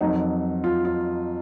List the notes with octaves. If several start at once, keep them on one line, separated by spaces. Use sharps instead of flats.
F2 D#3 F#3 D#4
F4
F4